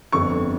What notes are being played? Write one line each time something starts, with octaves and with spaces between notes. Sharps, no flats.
G1 F2 D3 C#6